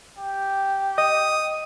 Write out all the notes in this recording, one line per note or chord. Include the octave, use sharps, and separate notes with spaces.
G4
D#5 D#6